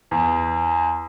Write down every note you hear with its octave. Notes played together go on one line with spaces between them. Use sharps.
E2